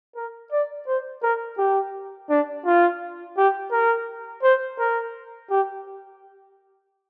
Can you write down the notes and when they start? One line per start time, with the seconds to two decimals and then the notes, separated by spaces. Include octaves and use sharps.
0.16 A#4
0.52 D5
0.87 C5
1.23 A#4
1.58 G4
2.30 D4
2.65 F4
3.37 G4
3.72 A#4
4.43 C5
4.79 A#4
5.50 G4